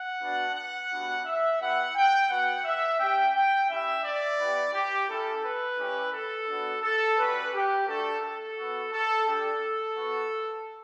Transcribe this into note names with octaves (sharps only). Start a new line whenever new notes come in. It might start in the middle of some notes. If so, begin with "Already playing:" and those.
Already playing: F#5
B3 D4 F#4
F#5
G3 B3 D4 F#4
E5
B3 E4 G4 F#5
G5
B3 F#4 F#5
E5
C#4 G4 G5
G5
C#4 E4 G4 E5
D5
B3 E4 G4
G4
C#4 E4 G4 A4
B4
G3 C#4 E4 G4
A4
B3 D4 F#4
A4
G3 C#4 F#4 B4
G4
A3 D4 F#4 A4
A4
B3 F#4
A4
G3 D4 G4 A4
B3 F#4